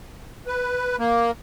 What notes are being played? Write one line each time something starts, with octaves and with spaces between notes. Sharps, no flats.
B4
A#3